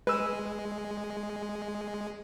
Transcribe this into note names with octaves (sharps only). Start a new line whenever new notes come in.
G#3 B4 E6 D#7